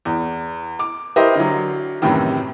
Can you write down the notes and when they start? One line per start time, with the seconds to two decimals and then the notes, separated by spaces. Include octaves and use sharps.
0.05 E2
0.79 D6
1.16 E4 G4 A#4 C5 D#5
1.35 D3 F#3
2.02 F#2 A2 C3 D#3 E3